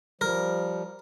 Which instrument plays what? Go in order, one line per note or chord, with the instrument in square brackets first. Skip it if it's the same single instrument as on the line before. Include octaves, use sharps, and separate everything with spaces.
[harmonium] F3 G3 [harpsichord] A#4